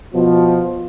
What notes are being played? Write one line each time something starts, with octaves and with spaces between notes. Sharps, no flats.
B2 F3